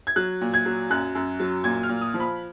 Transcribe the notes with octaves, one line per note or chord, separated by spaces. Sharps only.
G#6
F#3 F#6
A#2
G#6
F#3
F#2 F#6
F#2
F#3
A#2 G#6
F6
A#2
D#6
F3
B5